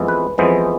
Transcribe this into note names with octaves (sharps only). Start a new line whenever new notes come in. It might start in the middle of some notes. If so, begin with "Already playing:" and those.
Already playing: F2 E3 G#3 B3
B4
F2 E3 G#3 B3 C5